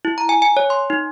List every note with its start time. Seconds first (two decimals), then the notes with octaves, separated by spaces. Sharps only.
0.05 E4
0.18 A#5
0.29 G#5
0.42 G#5
0.57 C#5
0.70 C6
0.90 D#4